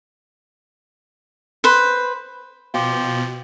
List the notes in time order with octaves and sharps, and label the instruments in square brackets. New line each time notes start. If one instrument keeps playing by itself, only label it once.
[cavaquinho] B4 C5
[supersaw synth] B2 [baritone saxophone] F3 [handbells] F5 G5 D6